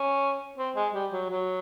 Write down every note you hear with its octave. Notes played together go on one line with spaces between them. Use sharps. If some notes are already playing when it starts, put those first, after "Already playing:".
Already playing: C#4
C4
G#3
G3
F#3
F#3